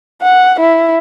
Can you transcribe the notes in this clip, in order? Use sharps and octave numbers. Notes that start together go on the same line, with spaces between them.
F#5
E4